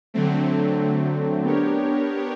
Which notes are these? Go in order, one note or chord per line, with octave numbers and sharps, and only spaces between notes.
D3 F#3 A3 C4
B3 D4 G4 A#4 C#5